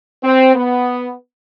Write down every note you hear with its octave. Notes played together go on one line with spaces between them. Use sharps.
C4
B3